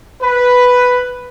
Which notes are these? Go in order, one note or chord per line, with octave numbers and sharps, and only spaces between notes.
B4